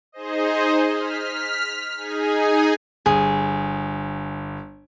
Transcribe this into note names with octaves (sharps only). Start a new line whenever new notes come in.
D#4 G#4 C5 D#5
F6 B6
D#4 G#4 G#5
G1 G#4